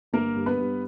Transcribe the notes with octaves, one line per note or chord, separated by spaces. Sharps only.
G1 A#3 A#4
G2
B3 B4
G2